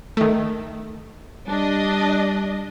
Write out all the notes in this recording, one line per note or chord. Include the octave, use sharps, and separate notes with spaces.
D#3 A3
G3 D4 D#5